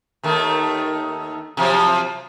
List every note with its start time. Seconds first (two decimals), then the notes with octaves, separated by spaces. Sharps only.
0.23 D#2 D#3 A3
1.57 C3 F3 F#3